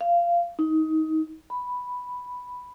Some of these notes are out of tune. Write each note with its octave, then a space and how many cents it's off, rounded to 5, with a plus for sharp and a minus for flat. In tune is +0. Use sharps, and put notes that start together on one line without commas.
F5 -15
D#4 +20
B5 +0